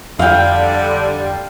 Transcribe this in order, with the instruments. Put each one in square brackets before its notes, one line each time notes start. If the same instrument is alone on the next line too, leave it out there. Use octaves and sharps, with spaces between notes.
[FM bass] F2 [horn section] D3 G3 [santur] F5 G5